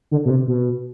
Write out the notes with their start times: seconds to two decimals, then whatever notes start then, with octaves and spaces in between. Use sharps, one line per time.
0.11 D3
0.25 B2
0.30 C3
0.47 B2